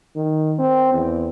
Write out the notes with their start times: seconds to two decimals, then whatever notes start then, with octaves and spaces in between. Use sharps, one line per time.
0.16 D#3
0.59 C4
0.93 E2